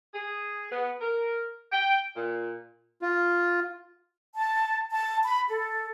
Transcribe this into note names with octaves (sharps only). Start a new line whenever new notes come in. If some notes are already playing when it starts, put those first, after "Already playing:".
G#4
B3
A#4
G5
A#2
F4
A5
A5
B5
A4